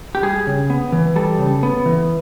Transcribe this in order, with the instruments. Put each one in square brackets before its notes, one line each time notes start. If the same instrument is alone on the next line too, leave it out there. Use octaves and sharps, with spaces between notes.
[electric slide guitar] G4
G3 G#4
C#3
B3
E3
G3 A4
C#3
B3
E3